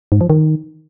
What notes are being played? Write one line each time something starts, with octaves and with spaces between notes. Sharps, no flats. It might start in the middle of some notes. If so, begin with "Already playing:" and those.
G#2
F3
D#3